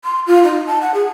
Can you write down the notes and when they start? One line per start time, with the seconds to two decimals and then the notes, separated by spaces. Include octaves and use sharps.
0.05 C6
0.27 F4
0.44 D#4
0.67 A5
0.81 F#5
0.94 G#4